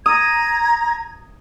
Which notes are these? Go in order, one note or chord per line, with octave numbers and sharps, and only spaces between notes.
A#5 D#6 G#6